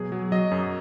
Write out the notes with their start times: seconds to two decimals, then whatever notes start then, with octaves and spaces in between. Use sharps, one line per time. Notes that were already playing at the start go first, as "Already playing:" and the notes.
Already playing: B2 F#3 G#4
0.12 F#3
0.32 F#3 D#5
0.51 F#2